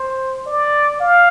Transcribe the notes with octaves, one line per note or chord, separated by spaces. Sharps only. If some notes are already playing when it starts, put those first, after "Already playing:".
Already playing: C5
D5
F5